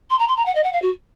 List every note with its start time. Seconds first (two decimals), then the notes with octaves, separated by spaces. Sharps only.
0.10 C6
0.18 A#5
0.27 C6
0.36 A#5
0.45 F#5
0.55 D#5
0.63 F#5
0.72 F5
0.82 F#4